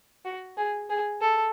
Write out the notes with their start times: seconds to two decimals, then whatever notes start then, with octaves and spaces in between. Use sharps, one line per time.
0.25 F#4
0.57 G#4
0.89 G#4
1.21 A4